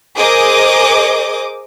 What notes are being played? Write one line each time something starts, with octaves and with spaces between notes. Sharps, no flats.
G#4 A#4 C5 D#5 D6 D#6